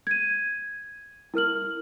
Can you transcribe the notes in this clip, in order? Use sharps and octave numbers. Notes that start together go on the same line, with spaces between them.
G#6 D#7
E4 A#4 F6 F#7